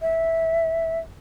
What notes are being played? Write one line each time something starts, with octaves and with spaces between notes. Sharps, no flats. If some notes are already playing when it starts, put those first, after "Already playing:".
E5